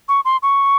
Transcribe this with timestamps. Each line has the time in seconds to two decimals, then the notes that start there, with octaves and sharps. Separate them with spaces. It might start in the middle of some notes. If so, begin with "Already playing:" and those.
0.09 C#6
0.25 C6
0.43 C#6